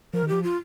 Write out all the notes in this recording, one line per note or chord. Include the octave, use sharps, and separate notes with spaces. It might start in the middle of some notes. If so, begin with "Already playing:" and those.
F3 A#4
D#3
F3 G4
F4